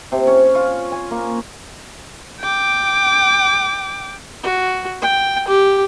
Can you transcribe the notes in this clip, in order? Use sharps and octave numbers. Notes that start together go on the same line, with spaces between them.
C3
C#4
F4
G#5
A#3
G5 D6
F#4
G5
G4